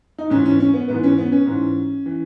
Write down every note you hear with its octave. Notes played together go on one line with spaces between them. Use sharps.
D#4
G#2 E3 C#4
C#4
C#4
B3
G#2 E3 B3
C#4
B3
C#4
G#2 E3
E3